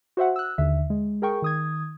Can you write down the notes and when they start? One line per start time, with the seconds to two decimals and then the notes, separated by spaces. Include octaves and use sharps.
0.17 F#4 C5 E5 F#5
0.36 E6 F#6
0.58 D#2 D3 E5
0.90 G#3
1.22 G#4 A#4 G5 C#6
1.42 D#3 D#6 G#6